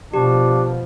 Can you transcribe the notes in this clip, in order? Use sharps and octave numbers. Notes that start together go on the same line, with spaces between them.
B2 F3 D4 G4